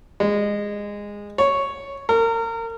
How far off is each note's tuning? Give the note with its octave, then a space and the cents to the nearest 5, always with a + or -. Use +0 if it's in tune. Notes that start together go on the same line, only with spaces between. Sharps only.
G#3 -15
C#5 +0
A#4 -30